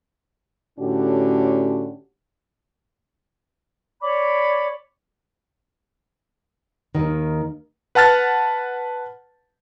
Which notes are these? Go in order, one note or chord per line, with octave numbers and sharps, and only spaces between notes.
A2 D3 C#4 D4 F#4 G4
C#5 D5 B5 D6
D#2 D#3
B4 F#5 A5 F6 A6